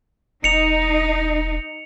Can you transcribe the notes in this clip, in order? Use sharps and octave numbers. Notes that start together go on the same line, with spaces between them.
E1 D#4 C#7 F7